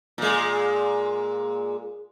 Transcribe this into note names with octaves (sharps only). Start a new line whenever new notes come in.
A#2 G#3